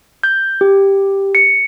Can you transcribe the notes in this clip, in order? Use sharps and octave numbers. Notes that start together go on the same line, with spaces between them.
G6
G4
C#7